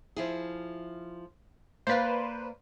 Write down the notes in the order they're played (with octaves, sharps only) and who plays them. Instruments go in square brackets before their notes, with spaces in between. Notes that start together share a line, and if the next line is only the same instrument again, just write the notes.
[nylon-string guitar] F3 E4 G#4
[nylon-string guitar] A#3 D5 F5 [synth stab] B4 C5